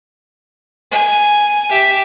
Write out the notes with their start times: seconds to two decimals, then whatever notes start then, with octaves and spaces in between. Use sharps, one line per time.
0.91 G#5
1.70 G4 E5